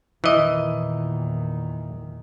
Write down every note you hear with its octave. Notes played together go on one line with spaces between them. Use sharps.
E2 A#2 D#3 E3 D#5